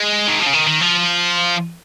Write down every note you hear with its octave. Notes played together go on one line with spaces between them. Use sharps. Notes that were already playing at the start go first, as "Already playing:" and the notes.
Already playing: G#3
D#3
F3
C#3
D#3
D#3
F3